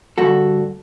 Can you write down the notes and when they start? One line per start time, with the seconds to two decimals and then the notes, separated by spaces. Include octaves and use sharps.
0.18 D2 G2 F#4 A4